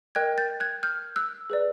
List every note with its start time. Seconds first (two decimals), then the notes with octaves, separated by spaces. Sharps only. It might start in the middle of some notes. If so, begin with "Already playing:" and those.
0.15 A#4 D#5 G5 F#6 G#6
0.38 G6 A6
0.60 F#6 G#6
0.83 F6 G6
1.16 E6 F#6
1.50 G#4 B4 D5